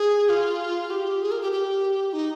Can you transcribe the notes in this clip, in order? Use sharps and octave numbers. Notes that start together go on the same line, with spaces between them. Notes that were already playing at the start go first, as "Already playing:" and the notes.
Already playing: G#4
F4
G4
G#4
A#4
G4
G4
D#4